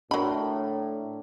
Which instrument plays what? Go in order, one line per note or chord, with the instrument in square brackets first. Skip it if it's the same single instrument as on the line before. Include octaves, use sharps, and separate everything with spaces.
[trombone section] A2 [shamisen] F#3 B5 [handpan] D4 A#4